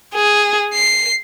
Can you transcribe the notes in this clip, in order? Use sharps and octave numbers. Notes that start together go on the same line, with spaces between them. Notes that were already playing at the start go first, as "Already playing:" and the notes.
G#4
C7